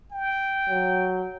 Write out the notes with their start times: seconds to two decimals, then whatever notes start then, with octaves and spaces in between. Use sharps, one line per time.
0.12 G5
0.70 F#3